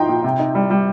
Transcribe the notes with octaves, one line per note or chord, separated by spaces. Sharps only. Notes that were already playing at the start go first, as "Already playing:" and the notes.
Already playing: F3 D#4 G5 A#5 C6
A#2
C3
D#4
G3
G3